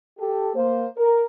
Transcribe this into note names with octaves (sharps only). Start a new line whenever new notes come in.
G4 A4
A#3 C5
A#4